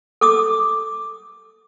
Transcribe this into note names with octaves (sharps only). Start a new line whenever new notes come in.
A4 D6 D#6